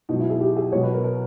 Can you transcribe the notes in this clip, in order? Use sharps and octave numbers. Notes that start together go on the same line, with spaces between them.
B2 F#3 D#4
E4
G#4
G4
G#4
B2 F#3 C#5
B4
A#4
A#4